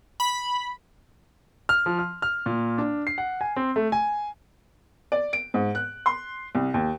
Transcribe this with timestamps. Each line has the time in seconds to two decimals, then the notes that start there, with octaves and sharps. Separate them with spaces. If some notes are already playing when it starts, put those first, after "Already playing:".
0.20 B5
1.69 F6
1.86 F3
1.99 F6
2.22 F6
2.46 A#2
2.78 D4
3.07 C7
3.18 F#5
3.41 G#5
3.56 C4
3.76 A3
3.92 G#5
5.12 D5
5.33 D7
5.54 G#2
5.75 F#6
6.06 C6
6.55 C2
6.74 D#2